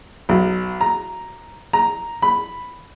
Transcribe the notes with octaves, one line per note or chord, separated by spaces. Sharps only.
B1
A#5
A#5
B5